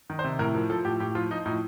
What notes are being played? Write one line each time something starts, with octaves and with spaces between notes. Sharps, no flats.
D#3
C5
C3
A2 A#4
F3 A#4
F3 A4
A2 G4
A2 G4
F3 F4
F3 D#4
A2 D#4